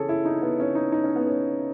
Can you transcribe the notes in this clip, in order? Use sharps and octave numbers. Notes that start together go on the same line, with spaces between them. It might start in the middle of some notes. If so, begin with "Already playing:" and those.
Already playing: C#3 E3 C#4 G#4 A4
E4
D#4
B3
C#4
D#4
D#4
C#4
B3
C#4